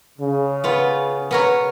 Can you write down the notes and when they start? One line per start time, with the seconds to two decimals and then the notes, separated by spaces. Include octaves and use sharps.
0.19 C#3
0.64 B3 F4
1.31 B3 A#4 C#5